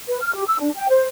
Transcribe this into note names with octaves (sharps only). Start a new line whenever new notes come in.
B4
F6
G4
E6
D4
G5
C5